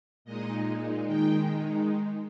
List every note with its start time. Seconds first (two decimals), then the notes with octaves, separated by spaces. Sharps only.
0.25 A#2 G#3 D#4 D#5
1.07 D#3 G#3 D#4 G5